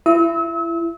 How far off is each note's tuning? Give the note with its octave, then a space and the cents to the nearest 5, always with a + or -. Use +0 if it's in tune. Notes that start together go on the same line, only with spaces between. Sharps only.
E4 +25 E6 -40